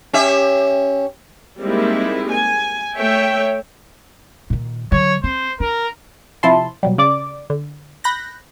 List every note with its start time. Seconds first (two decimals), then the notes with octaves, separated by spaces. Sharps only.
0.13 C#4 G4 E5
1.59 G3 G#3 A#3 C4 D#4 E4
2.31 G#5
2.96 A3 C#5 E5 G5
4.50 A#2 D#3
4.92 D3 F#3 C#5
5.24 C4 C5
5.60 D4 A#4
6.43 C3 F3 E4 A5 C6
6.83 B2 F#3 G3
6.98 C#3 D5 D6
7.50 D3
8.04 B5 F#6 G6 A#6